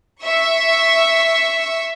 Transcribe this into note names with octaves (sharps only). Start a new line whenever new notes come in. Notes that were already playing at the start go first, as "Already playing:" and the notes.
E5 C#6